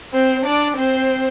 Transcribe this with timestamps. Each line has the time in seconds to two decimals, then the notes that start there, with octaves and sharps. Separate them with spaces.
0.14 C4 C5
0.45 D4 D5
0.77 C4 C5